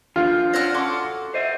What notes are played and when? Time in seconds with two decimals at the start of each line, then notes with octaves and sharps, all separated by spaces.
0.16 D3 F3 F4
0.54 C#4 D4 D#5 F#5 F6
0.74 F#4 A4 C6 D6
1.34 C5 D#5 E5